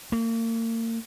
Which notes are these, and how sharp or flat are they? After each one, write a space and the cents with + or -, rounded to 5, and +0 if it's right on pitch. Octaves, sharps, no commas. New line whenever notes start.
A#3 -35